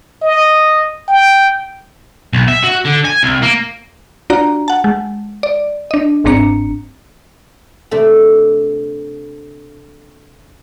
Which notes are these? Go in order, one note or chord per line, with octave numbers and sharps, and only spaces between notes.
D#5
G5
B1
E5
F#4
D3
G#5
C2
A#3
D4 F4 F#4 D5 A#5
F#5 A5
G#3
D5
D4 D#5
G1 G#2 C4 D4 A#5 C#7
C3 A3 D4 A4